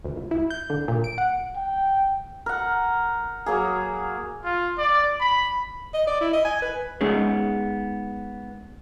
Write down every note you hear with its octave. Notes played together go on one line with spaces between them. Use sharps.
D2
C#2
E4
G6
D3
A#2
D7
F#5
G5
A#4 F#5
F#3 A#3 G#4
F4
D5
B5
D#5
D5
E4
D#5
G#5
B4
G#3 B3 C#4 D#4 G#4